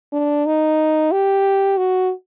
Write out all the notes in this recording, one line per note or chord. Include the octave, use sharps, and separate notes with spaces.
D4
D#4
G4
F#4